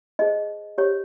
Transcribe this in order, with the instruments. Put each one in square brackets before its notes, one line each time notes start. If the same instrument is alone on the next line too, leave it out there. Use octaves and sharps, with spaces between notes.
[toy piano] D#4 G#4 C5 D#5
G4 C5 C#5